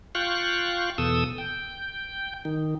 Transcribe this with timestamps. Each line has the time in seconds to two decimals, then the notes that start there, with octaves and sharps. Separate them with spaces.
0.15 F4 F5 G5 C#6 F#6
0.98 E2 B2 A4 D#6 E6
1.38 G5
2.45 D#3